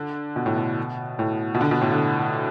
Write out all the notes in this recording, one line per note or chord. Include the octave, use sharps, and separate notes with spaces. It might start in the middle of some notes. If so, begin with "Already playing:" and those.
Already playing: D3
B2
A2
B2
A2
B2
D3
B2
A2
D3